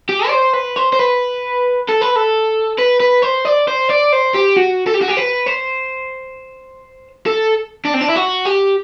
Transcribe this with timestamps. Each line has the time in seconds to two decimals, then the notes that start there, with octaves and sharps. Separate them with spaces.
0.09 G4
0.27 D5
0.31 C5
0.54 B4
0.76 C5
0.93 C5
0.99 B4
1.88 A4
2.01 B4
2.16 A4
2.78 B4
3.00 B4
3.22 C5
3.45 D5
3.68 C5
3.89 D5
4.12 C5
4.35 G4
4.57 F#4
4.86 A4
4.94 G4
5.01 F#4
5.08 G4
5.17 B4
5.47 C5
7.26 A4
7.85 D4
7.94 C4
8.01 D4
8.09 E4
8.16 F#4
8.45 G4